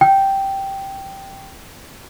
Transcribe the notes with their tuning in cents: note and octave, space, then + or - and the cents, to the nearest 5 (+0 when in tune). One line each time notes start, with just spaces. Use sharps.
G5 -5